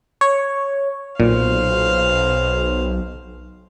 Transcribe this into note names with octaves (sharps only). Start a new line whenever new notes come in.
C#5
B1 A#2 C5 F5